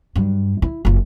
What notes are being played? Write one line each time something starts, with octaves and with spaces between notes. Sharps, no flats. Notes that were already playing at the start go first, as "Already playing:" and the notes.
G2 F#3
E4
F#1 F4